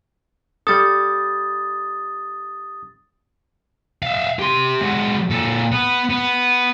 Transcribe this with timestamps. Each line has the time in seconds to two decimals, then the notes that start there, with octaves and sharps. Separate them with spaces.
0.67 G3 A4 D#6 A6
4.03 E5 F5
4.39 G4 C6
4.81 G#3 F#4
5.30 A#2 A4
5.72 B3
6.10 B3